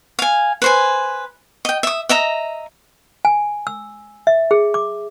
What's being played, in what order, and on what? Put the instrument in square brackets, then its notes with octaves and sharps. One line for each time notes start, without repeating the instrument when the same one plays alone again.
[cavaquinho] F5 G#5
B4 C5 G#5
D#5 G5
E5 D#6
D#5 E5 A#5
[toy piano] G#5
E6
E5
G#4
D6